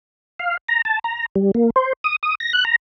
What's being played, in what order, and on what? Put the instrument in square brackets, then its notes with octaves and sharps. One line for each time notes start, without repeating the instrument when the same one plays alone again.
[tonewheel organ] F5
A#5
A5
A#5
G3
A#3
C5
D#6
D#6
A#6
F#6
A#5